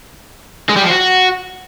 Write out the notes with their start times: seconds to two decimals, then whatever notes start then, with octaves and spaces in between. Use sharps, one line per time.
0.69 G#3
0.76 G3
0.83 F3
0.90 F#4